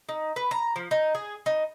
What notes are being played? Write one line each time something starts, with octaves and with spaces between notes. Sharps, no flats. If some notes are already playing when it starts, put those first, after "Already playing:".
D#4
B4
A#5
F3
D#4
G#4
D#4